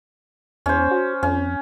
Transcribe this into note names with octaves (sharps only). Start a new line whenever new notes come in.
E2 C#4 C5
F#4
F2 C#4